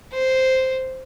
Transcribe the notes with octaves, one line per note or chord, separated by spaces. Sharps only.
C5